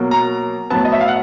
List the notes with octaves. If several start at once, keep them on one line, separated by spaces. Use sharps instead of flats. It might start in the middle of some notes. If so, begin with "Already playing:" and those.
Already playing: B2 F#3 A#3
A#5
A2 F#3 B3 A5
D#5
E5
F5
F#5